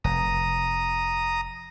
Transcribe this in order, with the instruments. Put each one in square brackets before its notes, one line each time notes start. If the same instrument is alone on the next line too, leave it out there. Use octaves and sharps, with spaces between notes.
[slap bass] F1 [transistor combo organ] A#5 D#6